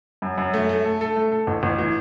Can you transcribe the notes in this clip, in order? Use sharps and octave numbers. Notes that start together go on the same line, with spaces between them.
F#2
F#2
A3
A3
A4
A4
A3
A4
A1
A1
E3